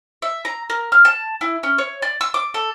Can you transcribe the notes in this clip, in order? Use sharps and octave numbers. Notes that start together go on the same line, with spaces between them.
E5
A#5
A#4
F6
A5
E4
C#4
C#5
D5
E6
D6
A4